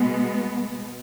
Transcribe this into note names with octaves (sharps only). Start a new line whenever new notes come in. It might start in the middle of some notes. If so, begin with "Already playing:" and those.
Already playing: B2 G#3 B3